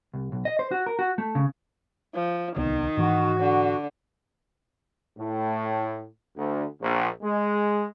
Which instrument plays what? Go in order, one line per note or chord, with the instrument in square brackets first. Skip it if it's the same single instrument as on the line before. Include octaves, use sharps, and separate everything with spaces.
[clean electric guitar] C2
B1
D#5
C5
F#4
A#4
F#4
A3
C#3
[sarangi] F3
[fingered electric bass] D1 C2 B3 [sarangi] D#3
[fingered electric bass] G#2 E3 [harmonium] F#4
[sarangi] D3
[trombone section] A2
D2
A#1
G#3